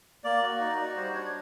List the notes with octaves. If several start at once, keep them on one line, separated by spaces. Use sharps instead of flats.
A#3 D5
F#4
D#4 D5
F#4
G3 C5
D4 C#5